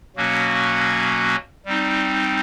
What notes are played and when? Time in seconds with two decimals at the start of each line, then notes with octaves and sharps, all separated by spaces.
0.17 B2 F#3 A#3 C#4 F#4
1.66 G3 C4 D#4